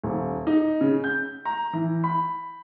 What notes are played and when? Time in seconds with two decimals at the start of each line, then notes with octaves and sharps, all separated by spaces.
0.03 D#1
0.47 D#4
0.81 C#3
1.04 G6
1.45 A#5
1.73 E3
2.04 B5